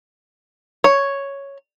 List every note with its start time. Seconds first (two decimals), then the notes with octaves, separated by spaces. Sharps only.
0.84 C#5